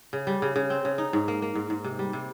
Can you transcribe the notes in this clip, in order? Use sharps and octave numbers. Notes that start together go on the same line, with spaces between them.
C#3
G3
C#3
C#3
C4
C#3
D#4
G#2
A#3
A#3
G#2
G#2
C3
G3
C3